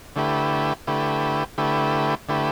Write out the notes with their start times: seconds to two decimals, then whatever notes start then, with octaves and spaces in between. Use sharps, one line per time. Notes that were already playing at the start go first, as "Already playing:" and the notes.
0.16 D3 A3 E4 G4 B4
0.87 D3 A3 E4 G4 B4
1.58 D3 A3 E4 G4 B4
2.29 D3 A3 E4 G4 B4